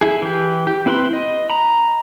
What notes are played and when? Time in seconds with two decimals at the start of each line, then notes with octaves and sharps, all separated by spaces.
0.01 E4 G#4
0.22 E3 G4
0.67 G4
0.86 C4 E4 B4 B5 C6
1.13 D#5
1.50 A#5 B5